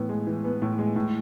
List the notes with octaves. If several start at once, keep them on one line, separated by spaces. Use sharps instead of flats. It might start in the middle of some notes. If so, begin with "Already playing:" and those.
Already playing: A2 E3 B3
G#3
E3
B3
A2
G#3
A2